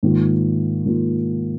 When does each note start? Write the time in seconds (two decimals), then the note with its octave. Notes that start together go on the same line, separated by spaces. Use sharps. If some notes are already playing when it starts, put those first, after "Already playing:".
0.03 G#2 D#3 A#3 F4
0.85 G#2 D#3 A#3 F4